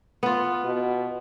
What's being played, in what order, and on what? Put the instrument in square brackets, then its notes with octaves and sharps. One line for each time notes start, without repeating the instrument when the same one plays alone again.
[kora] B3 F4
[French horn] B2